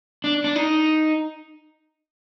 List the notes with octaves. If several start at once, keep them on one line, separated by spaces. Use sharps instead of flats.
D4
D4
D#4